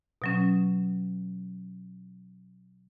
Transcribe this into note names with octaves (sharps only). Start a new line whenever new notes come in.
B2 F#3 C#4